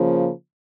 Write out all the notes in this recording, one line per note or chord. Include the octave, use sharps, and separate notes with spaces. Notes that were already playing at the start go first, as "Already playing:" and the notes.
Already playing: C#3 F3 A#3